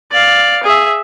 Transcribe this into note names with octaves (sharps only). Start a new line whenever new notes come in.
D5 F5
G#4 E5